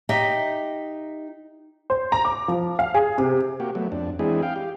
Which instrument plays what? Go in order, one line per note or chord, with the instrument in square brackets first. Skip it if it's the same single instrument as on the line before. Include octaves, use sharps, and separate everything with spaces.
[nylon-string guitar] D#4 G4 D#5 E5 G5
[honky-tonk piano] C5
A#5
D6
F3
F5
G#4
C3
[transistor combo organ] A#3 F#4 G4
F#3 A3 B3
F2 D4
E3 G#3 C4 D4 E4 G#4
F5 G5
G4